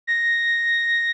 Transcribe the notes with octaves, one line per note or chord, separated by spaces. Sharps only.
A#6